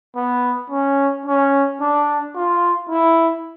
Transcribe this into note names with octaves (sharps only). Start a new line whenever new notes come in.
B3
C#4
C#4
D4
F4
E4